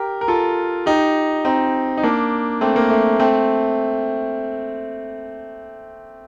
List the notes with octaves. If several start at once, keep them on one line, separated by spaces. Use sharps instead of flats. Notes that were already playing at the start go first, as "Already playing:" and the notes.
Already playing: G4 A#4
A#4
F4 A4
D#4 G4
C4 D#4
D#4
A#3 D4
A3 C4
A#3
A3
A3 C4